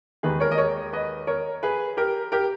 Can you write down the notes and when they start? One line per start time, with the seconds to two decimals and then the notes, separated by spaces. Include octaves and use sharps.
0.23 D#2 D#3 G#3 G#4 B4
0.40 A#4 C#5
0.52 D#5
0.58 A#4 C#5
0.93 B4 D#5
1.27 A#4 C#5
1.63 G#4 B4
1.97 G4 A#4
2.32 G4 A#4